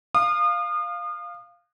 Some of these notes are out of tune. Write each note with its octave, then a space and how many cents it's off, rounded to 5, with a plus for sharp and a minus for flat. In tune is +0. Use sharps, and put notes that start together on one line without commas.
F5 +0 D#6 -35